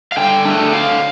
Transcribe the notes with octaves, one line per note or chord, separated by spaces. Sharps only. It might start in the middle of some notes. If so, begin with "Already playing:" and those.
F5
D3 G5
A3 D4
D3 F5